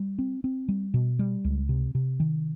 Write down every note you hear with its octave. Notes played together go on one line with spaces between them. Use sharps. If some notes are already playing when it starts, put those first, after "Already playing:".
Already playing: G3
C4
C4
G3
B2
G3
C#2
C3
C3
D#3